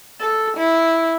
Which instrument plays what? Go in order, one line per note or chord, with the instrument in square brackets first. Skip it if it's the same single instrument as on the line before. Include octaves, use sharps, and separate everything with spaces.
[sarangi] A4
E4